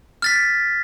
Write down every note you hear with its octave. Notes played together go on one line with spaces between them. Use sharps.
F6 A6 B6